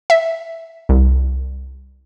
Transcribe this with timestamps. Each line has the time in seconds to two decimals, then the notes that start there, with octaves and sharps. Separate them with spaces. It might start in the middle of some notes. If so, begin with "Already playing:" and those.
0.10 E5
0.89 C2